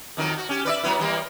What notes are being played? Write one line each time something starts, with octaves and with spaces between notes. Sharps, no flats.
F2 D#3 F#3
F#4
C#4 G4
B4 D5 E5
F#3 B3 E4
E3 G3 A#3